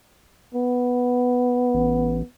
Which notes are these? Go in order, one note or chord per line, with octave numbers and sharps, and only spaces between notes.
B3
A1